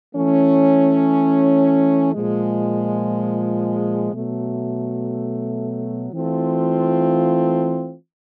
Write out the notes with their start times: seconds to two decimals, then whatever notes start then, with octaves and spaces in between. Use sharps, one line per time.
0.15 E3 A3 C#4
2.14 A#2 F3 G#3
4.13 B2 F#3 A3
6.13 E3 A3 C4 F4